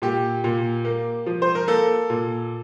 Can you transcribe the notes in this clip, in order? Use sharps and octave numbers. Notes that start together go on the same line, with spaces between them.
A#2 G4
A#2
A#3
F3
C5
A#4
A#3 A4
A#2